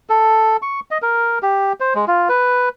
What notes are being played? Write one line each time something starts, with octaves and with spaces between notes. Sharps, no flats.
A4
C#6
D#5
A#4
G4
C5
G#3
F4
B4